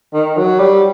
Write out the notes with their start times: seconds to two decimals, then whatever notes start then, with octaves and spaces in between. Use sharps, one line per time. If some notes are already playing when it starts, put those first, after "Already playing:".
0.14 D#3
0.37 F#3
0.59 G3